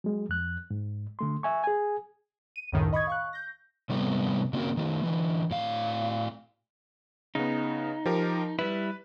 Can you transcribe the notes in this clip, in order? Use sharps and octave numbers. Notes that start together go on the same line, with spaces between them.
F#3 G#3
F2 F#6
G#2
D3 A3 C6
E5 G#5 C#6
G#4 G#5
D#7
C#2 F#2 A2 D#3
D#5 B5 C#6 D#6 G#6
F5 C#6 F#6
G6 A#6
G#2 C3 G3 A3 B3 C4
C#3 A#3 C4 C#4 F#4 A#4
D#3 A3
D3 E3
A2 F5
C#3 B3 D#4
F3 G4 A#4
G3 E4 B4